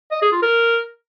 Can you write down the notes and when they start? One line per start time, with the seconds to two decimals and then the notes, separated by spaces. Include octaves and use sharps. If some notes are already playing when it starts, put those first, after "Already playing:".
0.11 D#5
0.22 G#4
0.32 F4
0.42 A#4